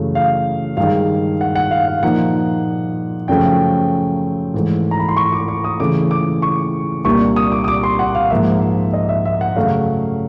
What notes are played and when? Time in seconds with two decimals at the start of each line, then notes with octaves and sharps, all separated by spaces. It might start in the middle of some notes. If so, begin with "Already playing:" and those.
Already playing: F#2 C#3 E3 A3
0.15 F5
0.77 G2 D#3 G#3 F5
1.41 F#5
1.56 F#5
1.71 F5
1.87 F5
2.03 A#2 F3 A#3 D#4 F#5
3.28 F#2 C#3 F3 A3 C#4 G5
4.54 G#2 E3 A3
4.91 A#5
4.99 B5
5.09 C6
5.17 C#6
5.32 D6
5.48 D6
5.64 D#6
5.80 C#3 E3 A3 D6
6.11 D6
6.42 C#6
7.05 C2 A#2 G3 A#3 D4 C#6
7.36 D#6
7.52 D6
7.64 D#6
7.68 D6
7.83 C6
7.99 F#5
8.15 F5
8.30 G#2 F3 A#3 E5
8.93 D#5
9.09 E5
9.25 E5
9.41 F#5
9.56 F#2 C#3 F#3 A3 F5